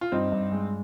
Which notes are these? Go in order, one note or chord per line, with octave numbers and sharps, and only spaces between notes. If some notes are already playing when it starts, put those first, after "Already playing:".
F4
G2 C4 D#4
G2
G#3